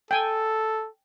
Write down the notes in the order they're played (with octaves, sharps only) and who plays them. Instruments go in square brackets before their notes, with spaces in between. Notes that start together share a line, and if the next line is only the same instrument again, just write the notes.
[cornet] A4 [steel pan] G5 G#5